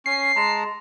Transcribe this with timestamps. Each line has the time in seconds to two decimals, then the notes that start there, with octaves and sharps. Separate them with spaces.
0.06 C#4 C7
0.36 G#3 A5 A#5